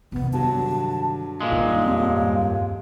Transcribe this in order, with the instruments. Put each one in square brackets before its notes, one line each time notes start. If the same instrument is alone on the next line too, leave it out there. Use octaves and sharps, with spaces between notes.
[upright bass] C3 D#3 [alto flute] B3
[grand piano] G2 D3 F#3 [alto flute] A5
[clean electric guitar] A#2 G#3 [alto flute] F5
[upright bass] G2 [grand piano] D#3
[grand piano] D#1 F2